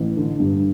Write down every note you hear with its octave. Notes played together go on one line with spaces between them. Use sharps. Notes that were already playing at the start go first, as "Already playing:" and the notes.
Already playing: A1
D3
G2